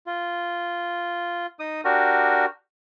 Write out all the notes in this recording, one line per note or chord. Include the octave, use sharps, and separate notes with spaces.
F4
D#4 D#6
D4 F#4 G4 A#4